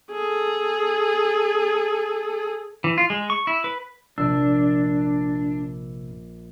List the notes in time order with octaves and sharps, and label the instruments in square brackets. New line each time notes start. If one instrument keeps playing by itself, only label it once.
[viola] G#4 A4
[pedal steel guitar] E3
F4
G#3
C#6
E4
B4
[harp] A#1 [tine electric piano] C3 E6 [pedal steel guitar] D4